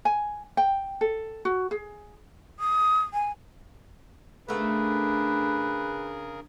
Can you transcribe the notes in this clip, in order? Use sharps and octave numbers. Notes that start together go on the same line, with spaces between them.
G#5
G5
A4
F#4
G#4
D#6
G#5
C#3 A3 B3 D4 G#4 A#4 B4